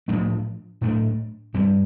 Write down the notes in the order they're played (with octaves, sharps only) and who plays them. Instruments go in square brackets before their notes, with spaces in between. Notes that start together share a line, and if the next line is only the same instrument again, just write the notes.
[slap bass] A2 F3 A3 D4
A2 A3 D4
G2 G3 C4